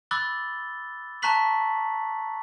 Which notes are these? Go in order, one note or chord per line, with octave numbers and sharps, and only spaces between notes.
B5 D6 E6 F#6 A6 G7
A5 A#5 C#6 F#6 B6 F#7